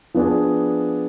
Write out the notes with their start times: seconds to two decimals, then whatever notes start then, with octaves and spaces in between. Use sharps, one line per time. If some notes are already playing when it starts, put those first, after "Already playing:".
0.14 F3 B3 D4 G#4